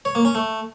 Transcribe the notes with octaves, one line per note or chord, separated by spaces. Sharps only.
C#5
A#3
C#4
A3